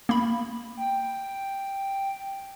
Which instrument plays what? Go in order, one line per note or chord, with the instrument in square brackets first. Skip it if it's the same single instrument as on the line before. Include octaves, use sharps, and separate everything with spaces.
[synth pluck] A#3 B5
[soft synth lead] G5